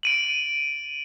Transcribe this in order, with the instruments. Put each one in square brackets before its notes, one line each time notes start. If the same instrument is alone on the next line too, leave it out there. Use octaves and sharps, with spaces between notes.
[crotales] D7 D#7 F#7